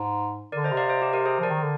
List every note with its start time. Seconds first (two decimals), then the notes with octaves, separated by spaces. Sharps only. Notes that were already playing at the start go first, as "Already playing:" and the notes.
Already playing: G#2
0.52 D3 A#4 D5
0.64 C5 D#5
0.72 C3
0.77 D5 F5
0.89 C5 D#5
1.02 G4
1.13 G4 A#4
1.26 G#4 C5
1.40 F3 A#4 D5
1.50 D#3
1.62 D3